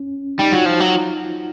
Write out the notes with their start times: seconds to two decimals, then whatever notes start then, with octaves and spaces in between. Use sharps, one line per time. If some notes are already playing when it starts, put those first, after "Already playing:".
Already playing: C#4
0.39 G3 D#4
0.52 F#3 F4
0.66 F3 F#4
0.80 F#3